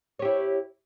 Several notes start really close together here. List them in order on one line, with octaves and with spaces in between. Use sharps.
C#5 G4 E4